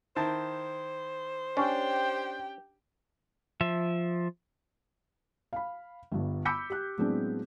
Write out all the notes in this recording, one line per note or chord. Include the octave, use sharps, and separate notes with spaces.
D#3 E4 C5 A5
C#4 D4 G4 G5
F3 E5
F5 B5
G1 G2
B5 D6 E6 G6 B6 C#7
G4 F#6
A2 F#3 G#3 B3 C4 D4